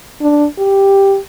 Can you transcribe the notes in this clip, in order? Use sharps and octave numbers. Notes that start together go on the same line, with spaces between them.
D4
G4